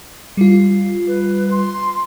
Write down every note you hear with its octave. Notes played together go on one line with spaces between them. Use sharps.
G3 F4
B4
C6